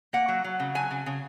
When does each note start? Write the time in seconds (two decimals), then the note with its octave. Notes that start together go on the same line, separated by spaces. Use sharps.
0.13 A#3 F#5
0.28 F#3
0.44 F#3
0.60 C#3
0.75 F#3 G#5
0.91 C#3
1.06 C#3